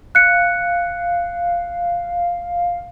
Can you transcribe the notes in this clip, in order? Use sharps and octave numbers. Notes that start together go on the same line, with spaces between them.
F5 F#6 C#7